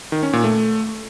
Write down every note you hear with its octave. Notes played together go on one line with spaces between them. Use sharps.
D#3
C#4
A#2
A3